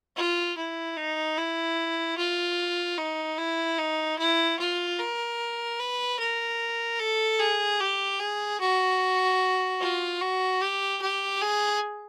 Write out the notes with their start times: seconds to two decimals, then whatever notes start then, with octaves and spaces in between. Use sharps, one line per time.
0.17 F4
0.57 E4
0.97 D#4
1.37 E4
2.17 F4
2.98 D#4
3.38 E4
3.78 D#4
4.18 E4
4.59 F4
4.99 A#4
5.79 B4
6.19 A#4
7.00 A4
7.39 G#4
7.80 G4
8.20 G#4
8.61 F#4
9.81 F4
10.21 F#4
10.61 G4
11.01 G4
11.42 G#4